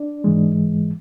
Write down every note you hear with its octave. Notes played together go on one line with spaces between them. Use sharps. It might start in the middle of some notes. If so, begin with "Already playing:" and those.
Already playing: D4 D5
G#2 E3 G#3